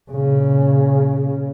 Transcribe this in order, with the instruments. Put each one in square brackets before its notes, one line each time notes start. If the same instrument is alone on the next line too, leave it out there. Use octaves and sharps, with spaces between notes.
[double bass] A#2 C#3